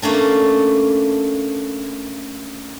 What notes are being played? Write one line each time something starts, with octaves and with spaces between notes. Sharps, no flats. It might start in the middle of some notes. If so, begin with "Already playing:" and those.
A3 A#3 C#4 D4